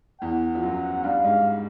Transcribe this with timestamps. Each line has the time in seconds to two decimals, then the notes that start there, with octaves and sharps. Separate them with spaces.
0.22 E2 E3 F#5
0.55 F3
0.62 F#2 F#3
1.04 G2 G3 F5
1.23 G#2 G#3